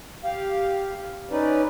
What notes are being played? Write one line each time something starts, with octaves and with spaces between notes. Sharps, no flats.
G4 F5
C#4 D#4 B4 D5